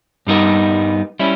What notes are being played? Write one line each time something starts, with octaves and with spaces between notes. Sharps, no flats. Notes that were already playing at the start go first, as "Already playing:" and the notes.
G2 G3 B3 D#4 A#4
G3 C#4 E4